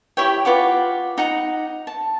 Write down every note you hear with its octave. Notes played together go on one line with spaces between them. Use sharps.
E4 G4 C#5 G5
F4 B4 F#5 D6
D#4 F#5 A#5
A5